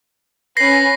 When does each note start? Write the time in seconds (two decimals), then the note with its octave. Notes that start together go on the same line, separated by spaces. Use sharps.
0.57 C#4 B4 A#6 C7